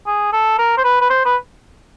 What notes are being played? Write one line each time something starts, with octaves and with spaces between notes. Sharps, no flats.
G#4
A4
A#4
C5
B4
B4
C5
B4